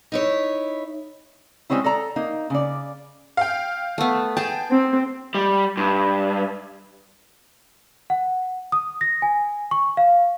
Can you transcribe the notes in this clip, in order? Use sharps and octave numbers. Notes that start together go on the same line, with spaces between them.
D#4 E4 C#5
G3 G#3 C4 C#4 E4
A4 D5 A#5
A#3 D#4
C#3 D5
F5 G5
A3 B3
G#4 G5 A5
C4
G3
G2
F#5
D#6
A#6
G#5
C#6
F5